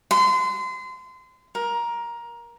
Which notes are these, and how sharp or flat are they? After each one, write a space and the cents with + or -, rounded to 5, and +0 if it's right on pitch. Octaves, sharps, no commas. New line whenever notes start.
C6 -30
A#4 +15